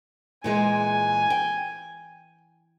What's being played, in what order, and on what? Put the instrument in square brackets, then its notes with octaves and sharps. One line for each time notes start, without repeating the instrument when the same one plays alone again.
[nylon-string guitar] A#2 E3 G#3 [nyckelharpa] G#5
[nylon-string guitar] G5